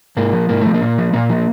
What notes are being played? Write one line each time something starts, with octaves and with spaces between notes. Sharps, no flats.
G#2 A#3
F3
G#2 A#3
F3 A3
A#3
A#2
F3
A#2 A#3
F3